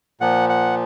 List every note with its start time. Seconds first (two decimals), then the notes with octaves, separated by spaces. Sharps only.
0.21 A#2 F3 F#5
0.49 F#5